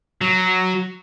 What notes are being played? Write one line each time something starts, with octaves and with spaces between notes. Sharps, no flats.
F#3